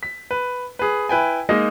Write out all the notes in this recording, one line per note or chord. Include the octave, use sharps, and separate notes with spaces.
B6
B4
G#4 B4
E4 B4 G5 G#5
G#3 A#3 D#4 D#5